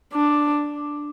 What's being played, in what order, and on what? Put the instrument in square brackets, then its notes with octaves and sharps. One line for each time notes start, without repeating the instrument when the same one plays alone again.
[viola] D4